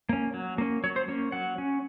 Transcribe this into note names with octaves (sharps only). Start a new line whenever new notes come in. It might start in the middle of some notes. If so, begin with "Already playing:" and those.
A#3 C#4
F#3
A#3 C#4
F#3 C#5
C5
A#3 C#4 C#5
F#3 F#5
C#4